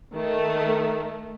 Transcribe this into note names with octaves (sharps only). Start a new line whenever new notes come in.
D#3 A3